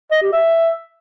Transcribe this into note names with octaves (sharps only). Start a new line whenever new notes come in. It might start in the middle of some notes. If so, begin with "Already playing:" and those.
D#5
G4
E5